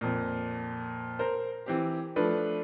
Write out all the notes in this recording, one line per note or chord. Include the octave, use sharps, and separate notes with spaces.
F2 A#2
A#4 C5
E3 C4 G4
F3 A3 D4 B4